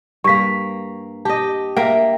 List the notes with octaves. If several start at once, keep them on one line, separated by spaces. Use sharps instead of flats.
G2 A#3 C#6 B6
G4 D#5 A5
A#3 A#4 E5 G5